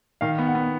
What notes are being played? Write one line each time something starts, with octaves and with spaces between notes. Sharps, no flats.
D#3 F5
B3
F#5
B3